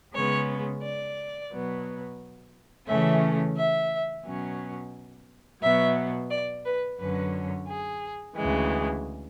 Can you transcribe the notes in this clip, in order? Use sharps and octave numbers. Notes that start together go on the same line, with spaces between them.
C#3 G#3 B3 C#5
D5
B2 F#3 B3
C#3 E3 A3 C#4 E5
E5
B2 F#3 C#4
B2 F#3 B3 E5
D5
B4
F#2 D3 F#3 C#4 B4
G#4
D2 C#3 E3 G#3